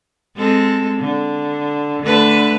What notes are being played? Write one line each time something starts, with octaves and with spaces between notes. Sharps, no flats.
G#3 C4 A4
D3
D3 A3 B4